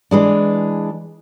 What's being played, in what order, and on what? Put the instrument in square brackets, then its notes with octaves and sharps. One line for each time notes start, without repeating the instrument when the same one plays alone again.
[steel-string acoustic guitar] E3 G#3 D4